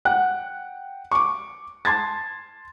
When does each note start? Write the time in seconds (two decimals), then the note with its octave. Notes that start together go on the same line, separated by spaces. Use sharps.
0.05 F#5 G5 F#6
1.11 C#6 D6
1.85 A5 C6 G#6 A6